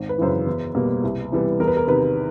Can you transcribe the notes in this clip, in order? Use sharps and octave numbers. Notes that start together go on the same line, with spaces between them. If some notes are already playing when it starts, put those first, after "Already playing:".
Already playing: G#1
B4
F#2 C#3 E3 C5
B4
E2
B2 G3 A#3
C2
C3 E3 G3 B3
E2 A#4
B4
A#4
C3 D#3 B4